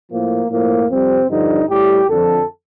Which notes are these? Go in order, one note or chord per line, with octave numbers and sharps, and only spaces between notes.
A2 F3 A#3
A2 F3 A#3
F2 C3 G3 C4
G2 D3 F3 D#4
A2 G3 G4
F2 D3 F3 A4